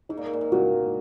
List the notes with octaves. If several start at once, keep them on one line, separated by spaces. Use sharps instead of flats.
G#2 D#4
A#2
G#2
A#2
G#2
A#2 F#4